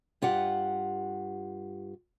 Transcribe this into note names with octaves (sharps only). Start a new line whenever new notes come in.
G2 F4 G4 F#5